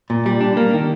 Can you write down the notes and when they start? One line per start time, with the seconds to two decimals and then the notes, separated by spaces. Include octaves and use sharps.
0.10 A#2
0.26 G3
0.41 D4
0.57 A#3
0.74 D#3